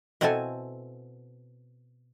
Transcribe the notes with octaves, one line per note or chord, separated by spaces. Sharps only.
B2 C4 E4 A4 G#5 A5